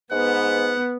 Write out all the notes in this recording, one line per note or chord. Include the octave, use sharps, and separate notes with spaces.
G#2 B3 F#5